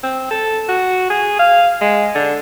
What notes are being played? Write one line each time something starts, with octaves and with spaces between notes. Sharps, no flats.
C4
A4
F#4
G#4
F5
G#3
D3